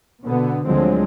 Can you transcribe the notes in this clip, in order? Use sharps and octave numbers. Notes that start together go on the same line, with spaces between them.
B2 D3 B3
D2 D3 F3 F#3 G#3 C4